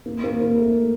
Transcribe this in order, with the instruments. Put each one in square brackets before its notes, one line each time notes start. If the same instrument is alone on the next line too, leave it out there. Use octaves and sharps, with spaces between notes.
[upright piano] A#3
A#3
A#3
A3